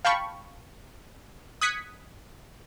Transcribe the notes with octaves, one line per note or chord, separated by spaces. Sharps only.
F5 G5 A5 B5 C#6
D#6 F#6 G#6 B6 C#7